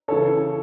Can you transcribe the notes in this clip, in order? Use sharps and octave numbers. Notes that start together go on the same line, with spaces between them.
C#3 E3 A4 C#5